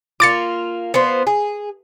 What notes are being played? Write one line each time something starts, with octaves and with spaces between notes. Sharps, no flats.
A#3 F4 D6 A6 C#7
B3 F4 C5
G#4